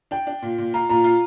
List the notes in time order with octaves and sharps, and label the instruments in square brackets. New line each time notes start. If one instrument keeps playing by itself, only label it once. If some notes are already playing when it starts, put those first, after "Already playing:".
[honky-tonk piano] D4 [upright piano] G5
[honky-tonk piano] D4
A#2
A#2
[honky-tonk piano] F4 [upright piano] A#5
[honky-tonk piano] A#2 [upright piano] A#5
[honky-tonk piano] F4